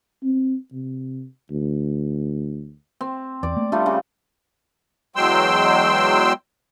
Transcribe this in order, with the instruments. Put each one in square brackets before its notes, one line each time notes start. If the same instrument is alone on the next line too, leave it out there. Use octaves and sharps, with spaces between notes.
[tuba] C4
C3
D2
[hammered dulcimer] C4
[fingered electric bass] E2 [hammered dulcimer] D5
[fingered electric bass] A3 A#3
[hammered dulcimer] G3 A3 F4 [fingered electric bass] D4
[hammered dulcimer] C#3
[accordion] E2 F#3 G#3 G5 C6 E6